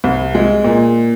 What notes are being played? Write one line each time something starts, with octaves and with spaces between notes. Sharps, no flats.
C2
G#3
A#2